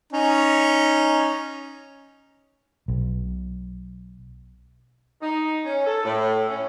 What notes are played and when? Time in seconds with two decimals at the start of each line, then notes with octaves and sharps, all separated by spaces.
0.13 C#4 D#4
2.88 B1
5.22 D#4
5.64 C#4
5.86 A4
6.05 A2
6.48 C#4